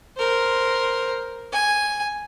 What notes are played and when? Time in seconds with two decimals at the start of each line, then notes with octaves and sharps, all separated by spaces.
0.17 A#4 C5
1.53 G#5